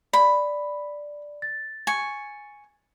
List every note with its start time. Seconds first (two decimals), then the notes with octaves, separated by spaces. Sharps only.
0.13 D5 B5
1.42 A6
1.87 G#5 C#6